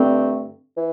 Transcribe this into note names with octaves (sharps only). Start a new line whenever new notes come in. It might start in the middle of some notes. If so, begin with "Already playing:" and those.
Already playing: G2 D3 A3 C4
E3